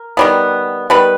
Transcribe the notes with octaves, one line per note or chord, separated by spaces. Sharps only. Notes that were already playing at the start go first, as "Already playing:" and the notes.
Already playing: A#4
D#3 G3 B3
D#3 G3 B3 B4